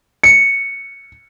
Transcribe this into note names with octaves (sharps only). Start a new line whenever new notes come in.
C#7